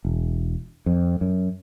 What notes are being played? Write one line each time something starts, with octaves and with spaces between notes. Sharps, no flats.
E1
F2
F#2